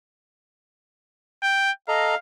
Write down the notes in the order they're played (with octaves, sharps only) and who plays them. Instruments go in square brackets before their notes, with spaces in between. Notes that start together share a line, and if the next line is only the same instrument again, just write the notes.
[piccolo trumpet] G5
[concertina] A4 D#5 A#5 [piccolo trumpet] F5